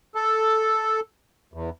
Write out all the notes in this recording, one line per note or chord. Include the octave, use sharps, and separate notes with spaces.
A4
E2